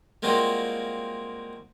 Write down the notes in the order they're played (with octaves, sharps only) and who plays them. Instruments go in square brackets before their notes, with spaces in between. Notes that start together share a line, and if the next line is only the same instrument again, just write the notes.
[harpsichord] G3 G#3 A#3 C4 F4 F#4